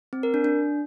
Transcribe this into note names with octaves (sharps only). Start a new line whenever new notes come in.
C4
A#4
D4
D4